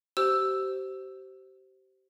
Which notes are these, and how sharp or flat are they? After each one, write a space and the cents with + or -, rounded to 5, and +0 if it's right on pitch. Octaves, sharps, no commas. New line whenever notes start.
G4 -35 C5 +0 E6 +0